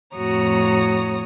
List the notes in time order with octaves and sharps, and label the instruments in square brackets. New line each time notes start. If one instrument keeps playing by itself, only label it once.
[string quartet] F2 A2 F#4 C#5 A#5 D#6